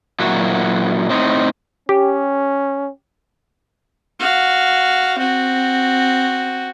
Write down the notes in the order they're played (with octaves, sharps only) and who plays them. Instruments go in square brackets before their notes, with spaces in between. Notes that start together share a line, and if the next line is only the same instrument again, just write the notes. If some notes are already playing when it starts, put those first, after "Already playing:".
[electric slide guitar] A#2 F#3 E4 F#4
A2 C4 D#4
[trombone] C#4 [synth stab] G4
[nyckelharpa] F#4 F5
C4 F#4